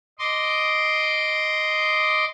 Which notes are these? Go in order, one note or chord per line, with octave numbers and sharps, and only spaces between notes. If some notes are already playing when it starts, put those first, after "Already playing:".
D#5 C6 D6